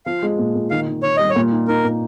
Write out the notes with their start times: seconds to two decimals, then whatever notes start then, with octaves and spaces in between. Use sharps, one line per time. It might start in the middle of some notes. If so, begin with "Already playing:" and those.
0.06 F3 F5
0.22 G#3
0.38 A#2
0.55 A#2
0.71 D#3 F5
0.87 D#3
1.03 D#3 C#5
1.17 G3 D#5
1.30 C#5
1.35 A#2
1.51 D#4
1.68 D#4 A#4
1.85 A#2